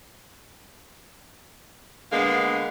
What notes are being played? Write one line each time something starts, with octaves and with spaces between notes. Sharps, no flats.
D3 G#3 A#3 B3 F5